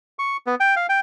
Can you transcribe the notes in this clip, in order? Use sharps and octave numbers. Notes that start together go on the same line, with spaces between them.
C#6
B3
G5
F5
G5